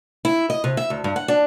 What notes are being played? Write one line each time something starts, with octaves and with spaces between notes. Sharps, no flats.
E4
D#5
C3
E5
D2
G2
F#5
D4